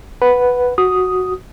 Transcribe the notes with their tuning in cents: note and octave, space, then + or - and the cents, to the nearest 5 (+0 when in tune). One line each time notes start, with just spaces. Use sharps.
B4 +0 F#5 +0
F#4 +0 D#6 +0